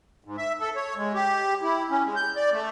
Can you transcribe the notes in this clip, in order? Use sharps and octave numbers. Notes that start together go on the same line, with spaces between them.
G#2
E5
A4
C#5
G#3
G4
E4
C#4
G#3
G6
D5
A3